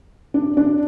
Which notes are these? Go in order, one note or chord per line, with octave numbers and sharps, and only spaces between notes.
D4
D4